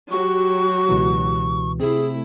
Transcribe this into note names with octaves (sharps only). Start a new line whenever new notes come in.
F#3 F#4 G4 C#6
C#2 B2 E3
C3 A3 C4 E4 G#4